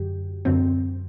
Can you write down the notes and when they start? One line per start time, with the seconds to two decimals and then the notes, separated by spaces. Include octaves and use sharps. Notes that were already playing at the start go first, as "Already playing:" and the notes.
Already playing: F#2 D3 F#3 G4
0.45 F#2 D3 F#3 C4